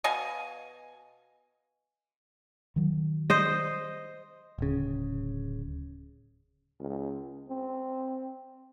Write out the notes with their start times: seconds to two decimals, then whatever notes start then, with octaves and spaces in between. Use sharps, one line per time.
0.04 B2 D#5 F5 G#5
2.76 D#3 F#3
3.30 C5 D#5
4.58 D1 C#3
6.80 C#2
7.48 C4